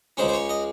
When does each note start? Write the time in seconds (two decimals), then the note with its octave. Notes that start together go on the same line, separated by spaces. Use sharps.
0.17 C#2 C#3 G#3 C#4 C5
0.28 C5
0.34 C#5
0.49 D#5